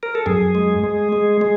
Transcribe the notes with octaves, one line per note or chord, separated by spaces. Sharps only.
A#4
A4
F#2 G#4
G#3
G#3
G#3
G#3